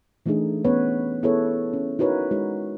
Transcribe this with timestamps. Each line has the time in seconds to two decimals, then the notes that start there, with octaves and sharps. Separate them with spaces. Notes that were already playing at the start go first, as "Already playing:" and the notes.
0.26 E3 A3 D4 D#4 G#4
0.64 B3 C#4 B4 C#5
1.23 B3 E4 G#4 A4 B4 C#5
1.73 C#4
1.99 D#4 E4 F#4 A#4 B4 C#5
2.31 G#3 D#4 F#4 C#5